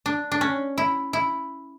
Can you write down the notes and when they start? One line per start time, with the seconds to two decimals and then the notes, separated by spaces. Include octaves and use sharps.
0.06 D4
0.32 D4
0.41 C#4
0.78 E4
1.13 E4